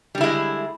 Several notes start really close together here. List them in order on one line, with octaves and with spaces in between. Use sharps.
G3 D3 E4 G#3